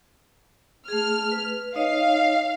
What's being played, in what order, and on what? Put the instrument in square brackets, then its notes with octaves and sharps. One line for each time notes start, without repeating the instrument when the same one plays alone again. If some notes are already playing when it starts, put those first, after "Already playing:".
[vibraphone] A3 G#4 [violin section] F6
[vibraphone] B4
[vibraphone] D#4 C#5 D#5 [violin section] F5